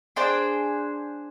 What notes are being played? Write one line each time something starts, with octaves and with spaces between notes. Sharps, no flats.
D4 G#4 C5 G5